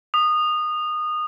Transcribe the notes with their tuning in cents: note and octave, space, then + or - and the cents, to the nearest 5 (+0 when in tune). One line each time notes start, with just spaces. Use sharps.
D#6 -20